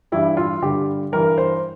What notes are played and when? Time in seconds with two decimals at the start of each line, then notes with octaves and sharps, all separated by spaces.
0.12 G2 E3 G3 E4
0.37 F4
0.62 G2 D3 G3 G4
1.12 G2 E3 G3 A#4
1.38 C5